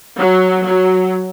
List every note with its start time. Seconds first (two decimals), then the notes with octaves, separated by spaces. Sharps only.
0.18 F#3
0.64 F#3